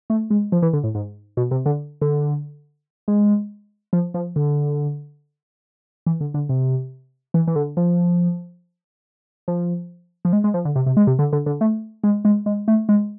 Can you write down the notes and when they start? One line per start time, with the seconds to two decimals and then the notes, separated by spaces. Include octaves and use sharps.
0.10 A3
0.30 G#3
0.52 F3
0.62 E3
0.73 D3
0.84 A2
0.95 G#2
1.37 B2
1.51 C3
1.66 D3
2.02 D3
3.08 G#3
3.93 F3
4.14 F3
4.36 D3
6.06 E3
6.21 D3
6.34 D3
6.49 C3
7.34 E3
7.47 E3
7.56 D3
7.77 F3
9.48 F3
10.25 F3
10.33 G#3
10.44 G#3
10.54 F3
10.65 D3
10.75 C3
10.86 C3
10.97 G#3
11.07 C3
11.19 D3
11.33 D3
11.46 D3
11.61 A3
12.04 G#3
12.25 G#3
12.46 G#3
12.68 A3
12.89 G#3